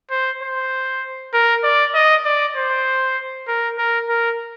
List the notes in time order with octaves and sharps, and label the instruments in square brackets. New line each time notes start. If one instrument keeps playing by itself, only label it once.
[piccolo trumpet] C5
C5
A#4
D5
D#5
D5
C5
A#4
A#4
A#4